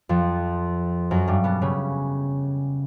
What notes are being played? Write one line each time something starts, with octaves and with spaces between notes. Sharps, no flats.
F2 F3
F#2 F#3
G2 G3
B2 B3
C#3 C#4